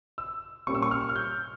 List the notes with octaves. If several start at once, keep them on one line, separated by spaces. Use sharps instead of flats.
E6
A#2 G3 A#3 C#4 C#6
E6
C#6
F6
F6
G6